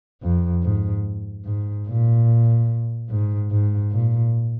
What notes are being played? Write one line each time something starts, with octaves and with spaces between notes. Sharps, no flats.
F2
G#2
G#2
A#2
G#2
G#2
A#2